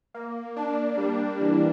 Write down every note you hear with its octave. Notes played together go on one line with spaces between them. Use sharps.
A#3
D4
G3
E3